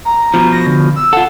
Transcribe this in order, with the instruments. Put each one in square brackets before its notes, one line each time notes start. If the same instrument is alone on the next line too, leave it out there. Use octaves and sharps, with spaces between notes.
[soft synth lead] A#5
[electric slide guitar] B2 F3
[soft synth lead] A#6
D3
E6
[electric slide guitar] F4 A4 [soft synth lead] F#5